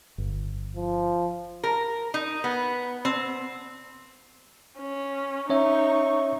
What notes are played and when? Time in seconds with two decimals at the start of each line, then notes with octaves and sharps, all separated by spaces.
0.18 G1
0.76 F3
1.64 A#4
2.14 D#4
2.44 B3
3.05 C4
4.80 C#4
5.50 C#4 D#4 C#5 E5 C#6